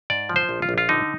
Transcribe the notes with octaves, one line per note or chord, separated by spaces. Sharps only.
G#2 D5
F3
C5
A#1
F4
A#1
F4
D3 D#4